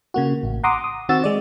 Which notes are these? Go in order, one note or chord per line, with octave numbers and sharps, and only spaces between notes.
C#3 A#3 F#4
A1
F#5 A#5 C6 D6 D#6
D#6
D#3 C4 F#4 E6 A6
G#3 D5